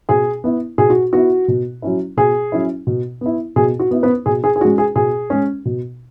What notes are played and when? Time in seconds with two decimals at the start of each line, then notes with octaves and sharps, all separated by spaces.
0.09 B2 G#4 G#5
0.44 B3 E4
0.78 B2 G#4
0.90 F#4
1.13 B3 E4 F#4
1.48 B2
1.82 F#3 C#4 E4
2.17 B2 G#4
2.52 F#3 C#4 E4
2.87 B2
3.21 B3 E4
3.56 B2 G#4
3.79 F#4
3.91 B3 E4
4.03 B3 B4
4.26 B2 G#4
4.44 G#4
4.56 G#4
4.60 C#4 F#4
4.65 G#3
4.78 G#4
4.95 B2 G#4
5.30 G#3 C#4
5.65 B2